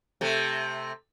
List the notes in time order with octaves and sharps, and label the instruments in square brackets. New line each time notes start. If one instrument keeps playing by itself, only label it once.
[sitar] C3 A3